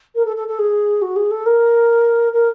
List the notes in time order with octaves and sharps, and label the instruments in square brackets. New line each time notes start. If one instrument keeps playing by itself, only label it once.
[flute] A#4
A4
A4
A4
G#4
F#4
G#4
A4
A#4
A#4